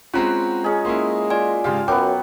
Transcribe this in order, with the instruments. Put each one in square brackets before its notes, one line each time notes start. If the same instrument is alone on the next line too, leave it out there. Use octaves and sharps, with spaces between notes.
[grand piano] G#3 C4 C#4 [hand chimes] F4 A#5 [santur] F#5
[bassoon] G#3 [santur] C#4 G#4
[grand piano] A#3 C#4 E4 [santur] C6
[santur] F4 [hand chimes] D5 G#5
[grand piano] G#2 C#3 G4 [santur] F5 A5 C6
[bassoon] F#2 [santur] F#3 B3 [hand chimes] G5 [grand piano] D6